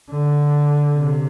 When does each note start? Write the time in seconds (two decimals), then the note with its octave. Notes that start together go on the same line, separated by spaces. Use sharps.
0.10 D3
0.96 C3